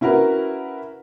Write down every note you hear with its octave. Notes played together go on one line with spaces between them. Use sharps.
C#4 E4 F#4 A#4 B4